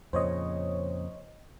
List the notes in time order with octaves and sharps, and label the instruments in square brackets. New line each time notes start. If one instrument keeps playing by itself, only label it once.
[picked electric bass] F2 A#2 C#3 [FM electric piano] C5 C#5 D#5